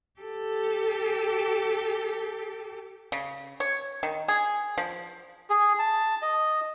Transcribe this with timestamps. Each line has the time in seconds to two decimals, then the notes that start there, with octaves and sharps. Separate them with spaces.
0.20 G4 A4
3.12 C#3
3.60 C#5
4.03 D#3
4.28 G#4
4.78 F3
5.50 G#4
5.79 A5
6.22 D#5